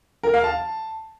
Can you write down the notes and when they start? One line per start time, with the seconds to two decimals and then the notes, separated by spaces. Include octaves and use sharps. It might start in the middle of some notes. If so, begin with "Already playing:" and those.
0.23 A#4
0.34 F5
0.44 A5